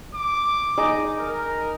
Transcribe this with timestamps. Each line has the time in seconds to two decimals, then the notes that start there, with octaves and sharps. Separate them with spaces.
0.14 D6
0.78 D#4 G#4 D#5
1.19 A#4